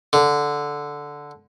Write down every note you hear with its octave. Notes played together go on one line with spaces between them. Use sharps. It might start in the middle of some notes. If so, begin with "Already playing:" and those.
D3